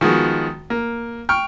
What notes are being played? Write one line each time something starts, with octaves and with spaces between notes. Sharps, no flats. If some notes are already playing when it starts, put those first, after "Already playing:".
D#3 F3 G#3 B3 F#4
A#3
G5 C#6 F6